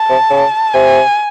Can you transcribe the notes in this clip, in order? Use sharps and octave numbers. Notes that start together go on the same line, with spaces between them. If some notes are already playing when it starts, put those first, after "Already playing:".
Already playing: A5
C3
C#3
C3 G#5